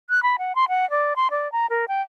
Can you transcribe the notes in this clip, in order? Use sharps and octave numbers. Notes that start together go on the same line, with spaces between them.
F#6
B5
F#5
C6
F#5
D5
C6
D5
A#5
A#4
G5